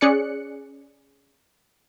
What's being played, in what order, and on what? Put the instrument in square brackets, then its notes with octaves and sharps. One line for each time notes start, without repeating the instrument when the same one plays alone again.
[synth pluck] C#4 G#4 D5 F#6 C#7